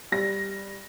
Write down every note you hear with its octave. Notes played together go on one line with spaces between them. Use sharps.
G3 A#6